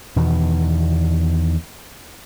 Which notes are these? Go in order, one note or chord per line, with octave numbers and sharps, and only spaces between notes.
E2 B2 D#3